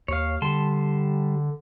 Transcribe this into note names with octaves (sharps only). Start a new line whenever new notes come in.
D#2 C#5 F5
D3 G3 A5 C6